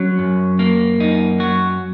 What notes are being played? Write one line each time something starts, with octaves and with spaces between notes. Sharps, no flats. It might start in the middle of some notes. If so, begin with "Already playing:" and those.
Already playing: F#3 C#4
F#2
A#3
F#2 D#4
F#3 F#4